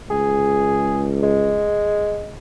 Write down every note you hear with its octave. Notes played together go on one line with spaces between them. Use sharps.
C#2 G#4
G#3